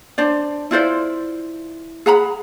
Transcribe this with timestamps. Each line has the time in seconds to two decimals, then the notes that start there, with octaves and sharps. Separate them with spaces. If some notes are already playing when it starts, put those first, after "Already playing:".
0.18 D4 C5 D5
0.71 E4 F4 C5 D5
2.06 G#4 F#5 A#5 B5